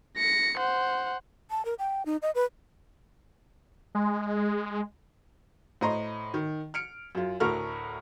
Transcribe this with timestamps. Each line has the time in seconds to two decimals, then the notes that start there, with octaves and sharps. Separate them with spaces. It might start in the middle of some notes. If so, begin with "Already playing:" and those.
0.17 A#6 C#7
0.58 C5 F#5
1.51 A5
1.65 A#4
1.79 G5
2.06 D#4
2.22 D#5
2.35 B4
3.95 G#3
5.81 A2 C5 D#5 A#5 C6
6.34 D#3
6.74 F6 C#7 D7
7.15 F#2 F4
7.40 D2 A2 A4 A#4 C#6 F6